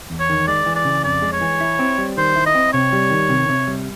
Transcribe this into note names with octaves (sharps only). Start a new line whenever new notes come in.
E2
C#5
D#3
G#3 D5
E3
D5
C#3
F2 D5
G#3
C#5
E3
E4
C4
G3
D#3 C5
E4
D#5
C4
C3 C#5
G3
D#3
C3
C3
G3